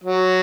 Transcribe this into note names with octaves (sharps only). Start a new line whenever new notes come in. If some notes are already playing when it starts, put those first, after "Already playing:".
F#3